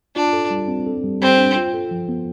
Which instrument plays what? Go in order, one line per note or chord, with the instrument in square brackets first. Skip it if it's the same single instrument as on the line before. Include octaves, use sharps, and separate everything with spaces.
[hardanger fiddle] D4 [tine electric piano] F4
[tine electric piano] A4
G3
C4
A4
G3
[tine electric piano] G3 [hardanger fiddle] C4
[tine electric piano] D4
F4
A4
F3
B3